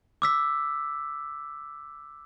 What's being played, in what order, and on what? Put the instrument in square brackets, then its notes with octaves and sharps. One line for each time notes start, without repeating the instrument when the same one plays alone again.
[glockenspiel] D6 E6 B6